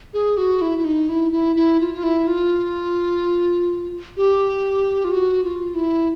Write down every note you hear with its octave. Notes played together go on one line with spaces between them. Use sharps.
G#4
F#4
E4
E4
D#4
E4
E4
E4
F4
F4
E4
F4
G4
F4
F#4
F4
E4